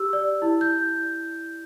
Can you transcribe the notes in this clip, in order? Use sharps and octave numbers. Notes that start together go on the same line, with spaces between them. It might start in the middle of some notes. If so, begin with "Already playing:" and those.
Already playing: G4 E6
D5
E4
G6